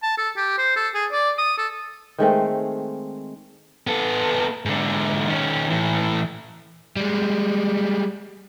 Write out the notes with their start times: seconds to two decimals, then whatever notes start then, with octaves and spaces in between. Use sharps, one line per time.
0.03 A5
0.18 A4
0.37 G4
0.58 C5
0.76 A4
0.95 G#4
1.12 D5
1.38 D#6
1.58 A4
2.18 D#3 G#3 A3 C4
3.87 B3 A4
4.65 G#2 D3
5.28 D#3 C#4
5.70 A2 E3
6.96 G3 G#3